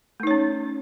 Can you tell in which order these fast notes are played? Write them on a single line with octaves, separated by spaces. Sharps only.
A3 D#4 C#5 C#4